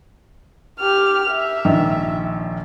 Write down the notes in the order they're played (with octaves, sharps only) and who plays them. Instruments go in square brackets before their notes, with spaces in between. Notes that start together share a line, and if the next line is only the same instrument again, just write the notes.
[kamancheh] G4 F6
E5
[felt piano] A#1 D#3